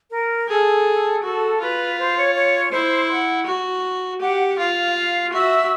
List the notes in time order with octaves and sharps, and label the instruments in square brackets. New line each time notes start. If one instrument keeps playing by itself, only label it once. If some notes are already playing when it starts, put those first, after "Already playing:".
[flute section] A#4
[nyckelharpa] G#4 [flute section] A4
[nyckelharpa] F#4 [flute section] A4
[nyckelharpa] F4 [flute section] B4
[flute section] C5
C#5
C#5
[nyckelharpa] E4 [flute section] C5
[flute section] F#5
[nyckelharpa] F#4
[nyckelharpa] G4 [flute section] F#5
[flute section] F#5
[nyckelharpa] F4 [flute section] F5
[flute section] F5
[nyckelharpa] F#4 [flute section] E5